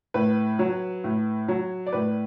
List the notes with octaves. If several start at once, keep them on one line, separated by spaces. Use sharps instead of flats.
A2 B4
F#3
A2
F#3
D5
A2 B4